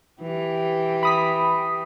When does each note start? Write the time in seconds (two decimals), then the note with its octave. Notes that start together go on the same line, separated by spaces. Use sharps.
0.21 E3 G4
1.03 B5 D#6 B6